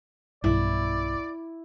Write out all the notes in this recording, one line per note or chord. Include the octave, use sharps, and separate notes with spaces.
B1 G2 B2 E4 D5